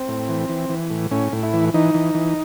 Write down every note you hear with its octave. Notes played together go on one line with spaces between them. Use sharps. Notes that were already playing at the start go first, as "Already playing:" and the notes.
Already playing: C4
A2
E3
E3
E3
A2
A2 C#4
A2
E4
E3
E3 D#4
E3
E3